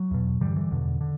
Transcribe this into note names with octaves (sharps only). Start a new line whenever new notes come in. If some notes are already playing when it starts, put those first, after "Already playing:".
Already playing: F#3
E2 B2
G2 D3 E3 G3
E3 G3
E2 B2 D3
D3